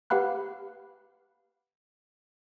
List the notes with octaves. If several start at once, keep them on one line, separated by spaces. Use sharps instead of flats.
G4 B4 F5 F#5 B5 F#6